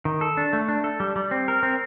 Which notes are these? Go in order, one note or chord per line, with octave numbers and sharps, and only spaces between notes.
D#3
A4
D4
A3
D4
A4
G3
G3
C4
A#4
C4